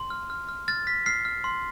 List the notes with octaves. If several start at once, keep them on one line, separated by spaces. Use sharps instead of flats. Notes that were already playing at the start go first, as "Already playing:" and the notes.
Already playing: C6
F6
F6
F6
F6 A6
F6 B6
F6 C7
F6
C6